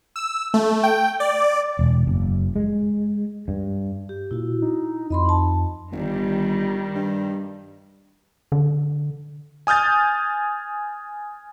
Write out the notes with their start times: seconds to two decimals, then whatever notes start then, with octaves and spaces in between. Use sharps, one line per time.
0.16 E6
0.54 A3
0.83 G5
1.20 D5
1.79 E1
2.07 F#1
2.56 G#3
3.48 G2
4.09 G4
4.31 A#2 E4 F#4
4.62 D#4
5.10 F2 D#5 B5 C6
5.25 D#4 A5
5.92 G1 D#3 G3
6.95 G2
8.52 D3
9.67 G#5 D#6 F6 G6 A6